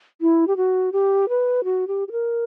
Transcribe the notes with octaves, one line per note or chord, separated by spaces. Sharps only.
E4
G4
F#4
G4
B4
F#4
G4
G4
A#4